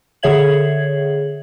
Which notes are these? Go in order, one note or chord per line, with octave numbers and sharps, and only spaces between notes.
D3 G#4 C#5 E5 G#6 F#7